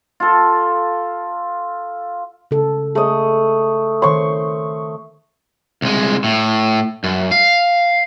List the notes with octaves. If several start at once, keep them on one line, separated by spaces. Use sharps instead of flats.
F4 A4
C#3 A4
A3 G#4 D#5
D#3 C5 C#5 C6 C#6
C2 G#3
A2
F#2
F5